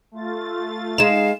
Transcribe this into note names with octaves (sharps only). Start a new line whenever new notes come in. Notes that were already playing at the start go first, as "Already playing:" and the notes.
A3 F4 A6
G#3 D#4 F5 E7